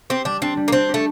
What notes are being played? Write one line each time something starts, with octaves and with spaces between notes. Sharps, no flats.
C4 G4
G3 D4
C4 D4
G3
A#3
C4 D4
G4
A3